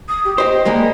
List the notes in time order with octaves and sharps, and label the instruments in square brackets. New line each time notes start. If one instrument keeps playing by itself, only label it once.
[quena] D#6
G4
[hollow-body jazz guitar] G4 C5 [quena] D#5
[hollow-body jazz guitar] G3 G#3 A#3